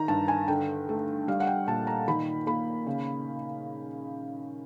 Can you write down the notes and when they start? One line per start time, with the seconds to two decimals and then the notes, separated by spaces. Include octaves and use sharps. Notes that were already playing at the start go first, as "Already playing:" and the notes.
Already playing: D#3 A#5
0.08 G2 A5
0.28 G#5
0.48 D3 G5
0.89 A3
1.28 G3 F5
1.40 F#5
1.47 G5
1.67 A#2 A5
1.87 A#5
2.08 D#3 B5
2.47 A#3 B5
2.87 C#3